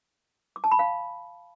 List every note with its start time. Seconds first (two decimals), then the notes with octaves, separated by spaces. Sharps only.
0.56 D6
0.64 A5
0.71 B5
0.79 F5